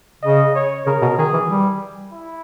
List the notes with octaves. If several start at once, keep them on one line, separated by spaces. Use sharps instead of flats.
C#3 D#5
C#5
C#3 A#4
B2
D#3 G#4
E3
G3
E4